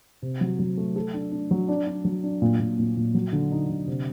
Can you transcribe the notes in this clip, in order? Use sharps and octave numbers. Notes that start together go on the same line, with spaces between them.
C3
F#3
F#3
A3
A4
D4
D4
F#3
D4
D4
F#3
D4
A#2
A#2
A#2
A#2
F#3
D3
D#4
D3
C3